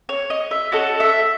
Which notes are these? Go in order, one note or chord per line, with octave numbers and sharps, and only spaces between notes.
C#5
D#5
E5
C#4 F#4 A4 D#5
E5